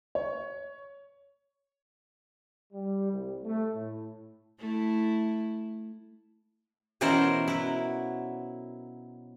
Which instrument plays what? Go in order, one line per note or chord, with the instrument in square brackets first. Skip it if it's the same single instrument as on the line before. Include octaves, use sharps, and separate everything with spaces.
[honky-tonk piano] C#5
[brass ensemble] G3
C2
A3
A2
[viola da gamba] A3 E4
[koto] B2 E3 C#4 A#4 C5 F#5
F#3 E4